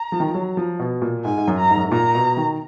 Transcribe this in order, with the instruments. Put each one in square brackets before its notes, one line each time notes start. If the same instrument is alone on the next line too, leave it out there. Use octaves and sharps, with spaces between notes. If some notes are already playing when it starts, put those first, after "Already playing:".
Already playing: [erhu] A#5
[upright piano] F3
D#3
F3
F#3
F3
B2
A#2
[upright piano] G#2 [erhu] G#5
[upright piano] G#2
F#2
[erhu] A#5
[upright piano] G#2
F#2
G#2
[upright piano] A#2 [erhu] A#5
[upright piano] B2
D#3